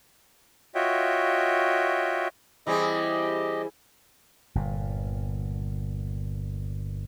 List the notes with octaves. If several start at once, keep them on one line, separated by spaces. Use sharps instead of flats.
F4 F#4 C#5 D#5 E5 G5
E3 G3 C4 E4 G4 G#4 D#5
G1 A#2